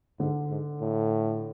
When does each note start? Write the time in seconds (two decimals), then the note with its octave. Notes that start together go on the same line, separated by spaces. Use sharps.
0.20 G#2 D3
0.50 G#2
0.81 A2